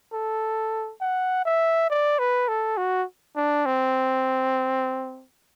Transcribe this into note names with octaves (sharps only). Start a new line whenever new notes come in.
A4
F#5
E5
D5
B4
A4
F#4
D4
C4